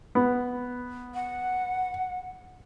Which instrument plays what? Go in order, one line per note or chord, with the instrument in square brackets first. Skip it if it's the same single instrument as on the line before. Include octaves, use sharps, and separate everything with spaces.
[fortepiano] B3
[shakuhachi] F#5